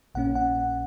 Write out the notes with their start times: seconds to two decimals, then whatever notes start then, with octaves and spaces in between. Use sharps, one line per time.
0.15 A#1 A#2 A#3 C#4 F#5
0.35 F#5